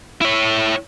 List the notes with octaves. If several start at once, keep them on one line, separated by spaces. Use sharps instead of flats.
E4 C#5